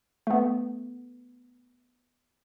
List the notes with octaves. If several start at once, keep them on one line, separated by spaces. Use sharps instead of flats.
A3 B3